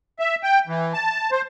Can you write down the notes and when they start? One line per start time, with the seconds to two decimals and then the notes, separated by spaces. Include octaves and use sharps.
0.19 E5
0.43 G5
0.67 E3
0.94 A5
1.32 C5